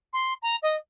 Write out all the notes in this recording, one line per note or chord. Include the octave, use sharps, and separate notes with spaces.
C6
A#5
D#5